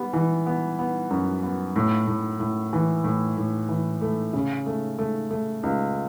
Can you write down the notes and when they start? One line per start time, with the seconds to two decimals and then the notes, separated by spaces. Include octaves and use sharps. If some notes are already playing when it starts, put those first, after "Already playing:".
Already playing: G3 B3
0.13 E3
0.46 B3
0.79 B3
1.10 F#2
1.43 B3
1.76 A2
2.07 A2
2.40 A2
2.73 E3
3.04 A2
3.37 A2
3.69 E3
4.02 A3
4.33 C#3
4.66 A3
4.99 A3
5.31 A3
5.63 C#2